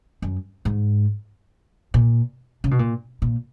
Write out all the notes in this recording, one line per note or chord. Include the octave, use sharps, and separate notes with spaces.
F#2
G#2
A#2
C#3
B2
A#2
A#2